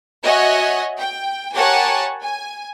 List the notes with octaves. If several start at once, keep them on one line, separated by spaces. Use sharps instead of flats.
F#4 C#5 D#5 E5 F#5 G#5
G5
G4 A#4 C#5 F#5 G#5 A5
G#5